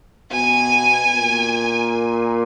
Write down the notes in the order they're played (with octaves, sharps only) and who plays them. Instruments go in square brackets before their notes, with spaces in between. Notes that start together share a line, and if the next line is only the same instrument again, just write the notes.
[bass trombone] B2 [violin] G#5
[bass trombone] A#2